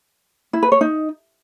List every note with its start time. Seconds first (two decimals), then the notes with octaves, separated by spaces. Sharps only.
0.53 E4
0.63 B4
0.72 C#5
0.81 D#4